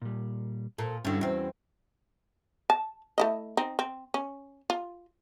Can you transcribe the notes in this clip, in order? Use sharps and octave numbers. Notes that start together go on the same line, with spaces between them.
A#2 G3
A#2 A4
G2 D3 C#4 E4 F#4
E2 C4
A5
A3 E4 D#5
C4 D#4
C4
C#4
F4